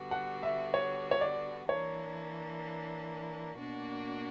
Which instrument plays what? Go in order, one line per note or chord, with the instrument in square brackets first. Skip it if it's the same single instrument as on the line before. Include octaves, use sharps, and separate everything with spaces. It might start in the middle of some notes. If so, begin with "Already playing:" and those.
Already playing: [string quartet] D3 G3 B3 F#4
[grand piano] F#5
E5
C#5
C#5
D5
[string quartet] E3 A#3 D4 [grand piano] C#5
[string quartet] B2 A#3 D4 F#4